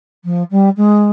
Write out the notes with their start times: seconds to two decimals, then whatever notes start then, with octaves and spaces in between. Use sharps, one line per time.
0.24 F3
0.51 G3
0.76 G#3